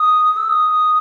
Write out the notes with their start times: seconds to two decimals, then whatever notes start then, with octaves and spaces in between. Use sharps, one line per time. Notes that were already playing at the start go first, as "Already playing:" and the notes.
Already playing: D#6
0.37 E6
0.48 D#6